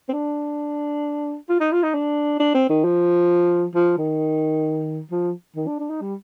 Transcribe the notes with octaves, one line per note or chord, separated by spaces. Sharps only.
C4
D4
F4
D#4
F4
D#4
D4
D4
C4
D#3
F3
F3
D#3
F3
D#3
D4
D4
D#4
G3